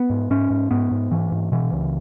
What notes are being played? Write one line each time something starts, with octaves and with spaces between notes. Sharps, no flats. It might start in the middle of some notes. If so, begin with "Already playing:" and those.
Already playing: B3
G#2
G#2 C#4
G#2
G#2 B3
G#2
G#2 E3
G#2
B2 E3
C#2